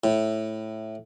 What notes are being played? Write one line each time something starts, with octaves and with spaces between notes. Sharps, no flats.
A2